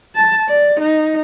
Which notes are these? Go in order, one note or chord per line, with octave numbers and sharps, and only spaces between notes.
A5
D5
D#4